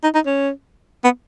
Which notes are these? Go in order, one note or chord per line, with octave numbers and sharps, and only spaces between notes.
D#4
D#4
C#4
B3